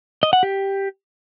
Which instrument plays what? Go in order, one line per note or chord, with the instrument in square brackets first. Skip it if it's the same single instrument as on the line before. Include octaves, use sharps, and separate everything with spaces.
[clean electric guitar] D#5
F#5
G4